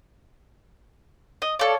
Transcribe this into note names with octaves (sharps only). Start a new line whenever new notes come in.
D#5
A4 C#5 D5 F5